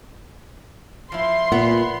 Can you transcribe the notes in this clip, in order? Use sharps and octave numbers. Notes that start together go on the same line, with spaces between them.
F3 E4 C6
A#2 B3